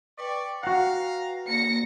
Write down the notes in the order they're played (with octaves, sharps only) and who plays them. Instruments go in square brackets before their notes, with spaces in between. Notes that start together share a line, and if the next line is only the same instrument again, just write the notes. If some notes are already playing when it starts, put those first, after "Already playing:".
[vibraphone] B4 G5 [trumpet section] D5 C#6
[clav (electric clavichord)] F#4 F#5 [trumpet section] F5 A#5
[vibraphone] A#3 D5 [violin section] A#6 C#7